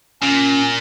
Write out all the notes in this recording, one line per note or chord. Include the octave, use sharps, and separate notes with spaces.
A#2 C#4